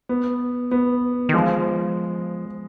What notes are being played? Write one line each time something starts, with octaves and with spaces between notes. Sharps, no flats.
B3
B3
D#3
F3 G#3